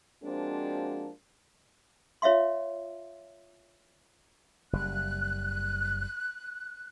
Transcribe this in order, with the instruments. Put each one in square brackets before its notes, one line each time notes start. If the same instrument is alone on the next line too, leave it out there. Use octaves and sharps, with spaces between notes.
[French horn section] F3 G#3 A#3 C4 D4 F#4
[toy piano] F4 C#5 E5 F5 C6
[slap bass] F#1 G3 [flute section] F#6